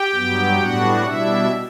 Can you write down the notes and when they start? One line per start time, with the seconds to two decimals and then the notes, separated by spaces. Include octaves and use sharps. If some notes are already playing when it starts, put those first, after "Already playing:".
Already playing: G4 G5
0.14 G2 F#3 B3
0.58 A2 G3 B3 D4 F#4 F#5
1.04 B2 G3 D4 E4 E5